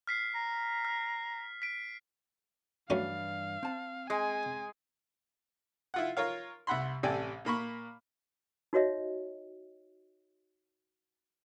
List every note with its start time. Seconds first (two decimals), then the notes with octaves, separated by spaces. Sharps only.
0.07 F6 B6 C7
0.35 A#5
0.85 F6
1.62 B6 D7
2.90 G2 E3 F#3 A3 C#4 D4 F5
3.63 C4 A5
4.10 G#3 G#5
5.94 E4 F4 F#5
6.17 F4 A#4 C#5 F5
6.67 C2 E5 F#5 B5 C6
7.03 A1 C3 A4 D5 G5 G#5
7.45 A#2 A#3 B5 C#6
8.73 D#4 F#4 C#5 D#5 E5